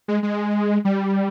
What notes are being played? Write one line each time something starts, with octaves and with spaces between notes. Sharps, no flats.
G#3
G#3
G3